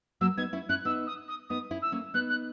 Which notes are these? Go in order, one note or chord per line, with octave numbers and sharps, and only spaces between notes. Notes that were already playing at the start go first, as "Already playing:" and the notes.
F#3 A#3 E6
B3 D#4 G#6
C#4 E4
C#4 E4 F#6
B3 D#4 E6
D#6
D#6
B3 D#4 D#6
C#4 E4
E6
A#3 C#4
B3 D#4 F#6
F#6